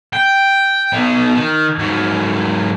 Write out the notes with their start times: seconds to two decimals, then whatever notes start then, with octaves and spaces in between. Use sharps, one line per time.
0.13 G5
0.93 B2 D#4
1.35 D#3
1.78 G#2 F#3